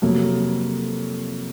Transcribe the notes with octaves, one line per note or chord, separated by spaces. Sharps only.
F2 C3 F#3 A#3